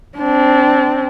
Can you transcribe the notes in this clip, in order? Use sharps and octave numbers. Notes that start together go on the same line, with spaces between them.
C4 D4